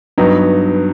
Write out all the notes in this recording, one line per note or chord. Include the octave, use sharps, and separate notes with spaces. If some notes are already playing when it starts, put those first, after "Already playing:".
G2 F#3 B3 D#4